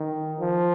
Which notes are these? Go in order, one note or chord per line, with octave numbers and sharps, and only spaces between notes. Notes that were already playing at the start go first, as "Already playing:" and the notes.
Already playing: D#3
F3